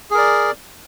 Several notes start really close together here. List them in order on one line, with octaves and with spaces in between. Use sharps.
G#4 A#4 D5